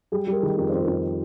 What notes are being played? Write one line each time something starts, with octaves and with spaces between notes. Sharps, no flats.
G3 G#4
G3
A#4
D#3 G#4
F2 A#4
F2 C5
G4 A#4
F2